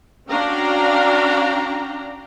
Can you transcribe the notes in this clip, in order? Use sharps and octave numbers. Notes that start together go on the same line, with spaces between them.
C#4 D4 F#4 F5 G5 A#5